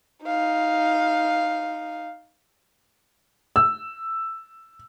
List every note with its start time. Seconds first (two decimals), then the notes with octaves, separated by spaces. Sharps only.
0.25 D#4 F5
3.56 E6